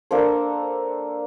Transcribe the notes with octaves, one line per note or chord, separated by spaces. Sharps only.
A#3 D4 A4 C5